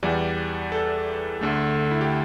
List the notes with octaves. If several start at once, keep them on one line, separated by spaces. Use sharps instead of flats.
E2 E3 G3 D5
A4
D2 D3 A3
E4
G4